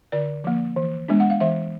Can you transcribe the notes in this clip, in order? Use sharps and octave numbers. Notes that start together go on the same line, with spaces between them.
D3 D5
F3 A#3
E3
G#3 B3 D4
F#5
F5
E3 E5